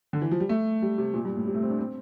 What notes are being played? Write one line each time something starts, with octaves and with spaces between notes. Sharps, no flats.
D3
E3
F3
G3
A3
G3
C3
A#2
G2
A2
C3
A3
C4
D4
C4